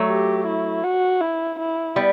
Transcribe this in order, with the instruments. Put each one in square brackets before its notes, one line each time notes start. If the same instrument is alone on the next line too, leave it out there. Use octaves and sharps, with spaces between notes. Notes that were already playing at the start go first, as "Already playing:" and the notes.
Already playing: [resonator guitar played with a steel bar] F#3 A3
[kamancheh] G4
E4
F#4
E4
E4
[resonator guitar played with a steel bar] G3 B3